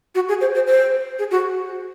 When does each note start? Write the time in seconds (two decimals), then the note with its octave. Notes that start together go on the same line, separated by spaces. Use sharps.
0.15 F#4
0.29 G#4
0.41 C5
0.55 C5
0.67 C5
1.19 G#4
1.31 F#4